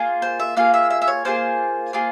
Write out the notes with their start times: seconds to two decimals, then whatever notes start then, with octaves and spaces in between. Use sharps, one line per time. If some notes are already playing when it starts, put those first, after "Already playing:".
Already playing: A#3 F4 G#4
0.22 C5
0.40 E5
0.57 A#3 F4 G#4 F5
0.74 E5
0.90 E5
1.02 E5
1.08 C#5
1.25 A#3 F4 G#4 C5
1.93 A#3 F4 G#4